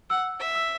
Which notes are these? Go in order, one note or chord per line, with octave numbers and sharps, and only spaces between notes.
F#5 E6
E5
E6